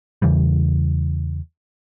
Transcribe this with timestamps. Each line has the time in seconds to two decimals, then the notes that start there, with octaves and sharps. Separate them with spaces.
0.22 E2 C#3 E3 G3